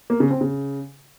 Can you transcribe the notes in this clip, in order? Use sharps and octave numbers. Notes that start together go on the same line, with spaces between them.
A#3
C#3
C4
C#3